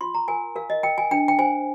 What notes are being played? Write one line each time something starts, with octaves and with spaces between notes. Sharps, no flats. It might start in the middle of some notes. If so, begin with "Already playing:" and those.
F4 C6
A#5
A#4 G#5
A#4 F5
D#5
A#4 G5
G#5
D4 G5
G5
C5 G#5